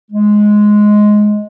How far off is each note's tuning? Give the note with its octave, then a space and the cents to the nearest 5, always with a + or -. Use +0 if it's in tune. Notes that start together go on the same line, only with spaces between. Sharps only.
G#3 +5